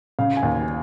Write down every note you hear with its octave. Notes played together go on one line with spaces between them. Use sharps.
C#3 F5
G#5
D#2
G#5